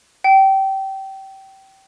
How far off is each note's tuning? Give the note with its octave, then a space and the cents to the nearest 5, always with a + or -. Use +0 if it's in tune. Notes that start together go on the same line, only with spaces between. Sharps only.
G5 -20